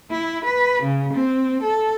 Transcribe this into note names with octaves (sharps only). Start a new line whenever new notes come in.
E4
B4
C#3
C4
A4